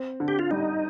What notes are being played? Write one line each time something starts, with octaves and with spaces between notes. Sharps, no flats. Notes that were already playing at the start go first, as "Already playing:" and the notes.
Already playing: C4
D3
G4
F4
G3 D#4